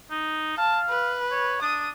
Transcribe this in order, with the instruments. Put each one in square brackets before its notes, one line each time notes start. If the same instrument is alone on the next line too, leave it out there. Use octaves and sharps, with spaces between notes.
[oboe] D#4
[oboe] F5 [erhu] A5
[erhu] B4
[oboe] C#5
[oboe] D4 [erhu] D#6